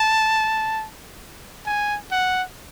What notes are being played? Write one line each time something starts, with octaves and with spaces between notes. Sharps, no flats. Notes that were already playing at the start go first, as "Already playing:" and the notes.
Already playing: A5
G#5
F#5